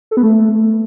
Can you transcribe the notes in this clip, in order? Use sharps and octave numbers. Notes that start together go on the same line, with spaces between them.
A4
B3
A3